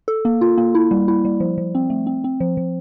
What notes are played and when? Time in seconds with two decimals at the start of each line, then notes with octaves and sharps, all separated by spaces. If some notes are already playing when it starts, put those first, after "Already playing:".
0.08 A4
0.25 A#3
0.41 F4
0.58 A#3
0.75 E4
0.91 G3
1.08 E4
1.25 G3
1.40 F3
1.58 F3
1.75 C4
1.90 A3
2.07 C4
2.24 C4
2.40 F3
2.57 F3